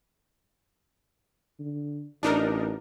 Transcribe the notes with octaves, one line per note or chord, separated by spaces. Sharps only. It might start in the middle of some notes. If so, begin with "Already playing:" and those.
D3
A1 D4 D#4 A#4